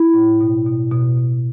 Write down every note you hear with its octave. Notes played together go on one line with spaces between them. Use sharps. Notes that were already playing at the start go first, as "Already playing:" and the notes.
Already playing: E4
A2
B2
B2
B2
B2